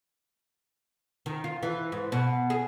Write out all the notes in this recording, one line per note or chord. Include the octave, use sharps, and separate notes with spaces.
D#3
F4
E3
G#2
B2
G#4